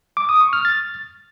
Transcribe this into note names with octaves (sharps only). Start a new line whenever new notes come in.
D6
D#6
C#6
F6
A6